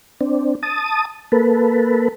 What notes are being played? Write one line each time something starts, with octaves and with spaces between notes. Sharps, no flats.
C4 D4
A5 D#6
A#3 A4 B4